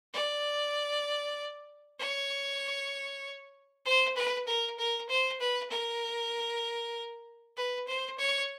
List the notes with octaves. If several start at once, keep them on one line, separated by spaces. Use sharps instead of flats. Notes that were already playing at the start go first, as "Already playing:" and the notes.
D5
C#5
C5
B4
A#4
A#4
C5
B4
A#4
B4
C5
C#5